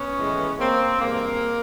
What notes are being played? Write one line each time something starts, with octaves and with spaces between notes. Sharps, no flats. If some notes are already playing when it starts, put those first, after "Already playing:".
Already playing: B3 C#4
A2 E3 G#3
A#3 C4
G2 E3 G#3 A#3